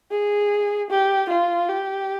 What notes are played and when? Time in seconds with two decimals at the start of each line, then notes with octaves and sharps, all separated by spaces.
0.11 G#4
0.90 G4
1.30 F4
1.69 G4